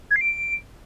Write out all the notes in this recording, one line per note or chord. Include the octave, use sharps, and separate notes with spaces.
G#6
C7
D7